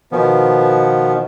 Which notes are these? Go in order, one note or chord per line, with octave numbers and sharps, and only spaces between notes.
B2 D#3 F3 B3